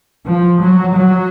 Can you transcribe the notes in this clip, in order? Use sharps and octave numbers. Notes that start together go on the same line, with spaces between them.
F3
F#3
F#3